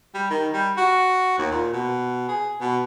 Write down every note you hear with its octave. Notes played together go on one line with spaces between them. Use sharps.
G3
D#3
G3
F#4
D#2
A#2
B2
G#4
B2